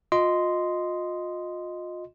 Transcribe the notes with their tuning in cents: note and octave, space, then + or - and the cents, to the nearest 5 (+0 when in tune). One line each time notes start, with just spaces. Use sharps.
F4 +35 D#5 +0 C6 -10